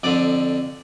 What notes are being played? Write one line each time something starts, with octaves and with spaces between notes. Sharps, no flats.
F2 D3 F3 D5